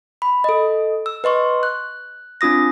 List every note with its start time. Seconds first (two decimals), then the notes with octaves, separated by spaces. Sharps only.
0.22 B5
0.44 A4 D#5
1.06 E6
1.24 B4 D#5 C6 C#6
1.63 F#6
2.41 C4 D4 F4 D#6 A#6